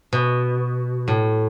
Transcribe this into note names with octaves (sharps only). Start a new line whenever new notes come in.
B2
A2